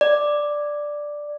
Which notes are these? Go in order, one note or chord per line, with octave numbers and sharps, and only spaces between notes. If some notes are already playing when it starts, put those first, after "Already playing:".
D5